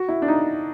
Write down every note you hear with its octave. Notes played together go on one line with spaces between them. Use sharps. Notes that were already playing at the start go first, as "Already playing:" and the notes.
Already playing: F#4
E4
D4
D#4